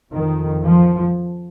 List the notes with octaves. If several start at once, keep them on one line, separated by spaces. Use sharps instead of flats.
F2 D#3
F3